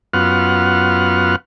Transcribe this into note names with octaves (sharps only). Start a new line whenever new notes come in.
F#2 B3 F4 F#5 F6